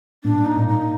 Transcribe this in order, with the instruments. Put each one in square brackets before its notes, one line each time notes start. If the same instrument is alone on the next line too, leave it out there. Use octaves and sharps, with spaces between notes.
[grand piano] A#2 [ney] D4
[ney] D#4
[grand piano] A#2
[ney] D#4